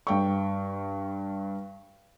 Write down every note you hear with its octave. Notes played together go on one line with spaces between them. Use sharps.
G2 G5 C#6